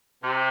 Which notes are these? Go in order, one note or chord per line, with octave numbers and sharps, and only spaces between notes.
C3